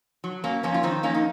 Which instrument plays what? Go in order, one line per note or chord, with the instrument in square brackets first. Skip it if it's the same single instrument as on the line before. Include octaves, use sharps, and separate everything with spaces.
[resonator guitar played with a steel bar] F#3
F#3 A#3 C#4
F2 A#3 C#4
F4
D#3 C4 D#4
F2 A#3 C#4
D#4